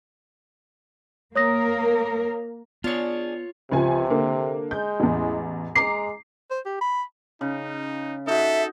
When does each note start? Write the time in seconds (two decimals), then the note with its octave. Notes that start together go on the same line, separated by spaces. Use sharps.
1.36 A#3 A#4 C#5 D#6 A#6
2.84 B3 D4 F4 G#4 C#5
3.71 C#2 C3 F3 G#5
4.10 D3 A#3
4.71 G#3 G6
5.00 A1 E2
5.75 G#3 A#5 D6 C7
6.51 C5
6.66 G4
6.81 B5
7.41 C#3 D#4
8.27 D#4 F#4 A4 E5